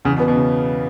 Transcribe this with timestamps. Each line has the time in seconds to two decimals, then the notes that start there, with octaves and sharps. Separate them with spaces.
0.05 E2 C#3
0.16 B2
0.20 B3
0.28 B2
0.35 C#3